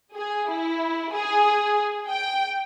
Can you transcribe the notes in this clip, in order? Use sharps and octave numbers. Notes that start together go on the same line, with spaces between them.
G#4
E4
G#4
G5